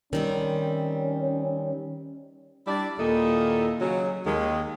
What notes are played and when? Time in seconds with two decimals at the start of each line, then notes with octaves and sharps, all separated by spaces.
0.13 D#3 G3 C4 C#4
2.67 G3 D4 E4 D5
2.99 D#2 A#2 D#4 E4 A4 D#5
3.81 C#3 F#3
4.26 D#2 D#3 G#3